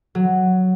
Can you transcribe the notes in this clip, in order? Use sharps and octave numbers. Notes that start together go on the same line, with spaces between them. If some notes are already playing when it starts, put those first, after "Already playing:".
F#3